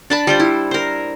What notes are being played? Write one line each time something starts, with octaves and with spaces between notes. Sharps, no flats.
D4 A5 B5
G3 F4 C5
E4
A#4 C5